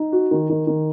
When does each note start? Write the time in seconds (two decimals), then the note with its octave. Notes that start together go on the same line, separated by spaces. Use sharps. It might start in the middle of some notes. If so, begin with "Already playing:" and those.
Already playing: D#4
0.12 F#4
0.31 D#3
0.50 D#3
0.67 D#3